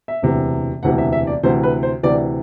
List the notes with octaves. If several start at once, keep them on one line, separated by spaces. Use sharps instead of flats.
E5
E1 D2 C3 E3
E1 D2 C3 E3 F#5
E5
E5
D5
D2 C3 E3 C5
B4
C5
D2 C3 E3 D5